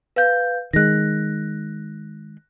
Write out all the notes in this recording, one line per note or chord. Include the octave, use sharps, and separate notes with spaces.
B4 F5 G6
D#3 G#3 F#6 A#6